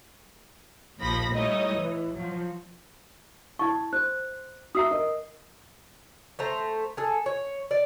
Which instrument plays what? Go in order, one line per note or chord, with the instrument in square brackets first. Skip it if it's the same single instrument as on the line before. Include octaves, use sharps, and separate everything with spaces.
[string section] A#1 D#2 F3 B5 A#6
G3 A3 D#4 E4 C#5 D#5
E3
F3 F#3
[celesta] E4 C#6 [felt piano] A5 G#6
[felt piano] C5 [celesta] F#6
[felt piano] F#4 E5 A#5 [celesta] D#6 E6 C7
[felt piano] A#4 D#5
[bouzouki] A3 C5 A#5
G#4 A4
C#5
D5